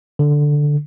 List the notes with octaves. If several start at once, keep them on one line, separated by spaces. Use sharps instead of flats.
D3